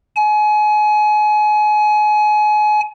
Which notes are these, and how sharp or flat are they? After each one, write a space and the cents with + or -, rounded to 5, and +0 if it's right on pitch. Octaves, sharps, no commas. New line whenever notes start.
G#5 +30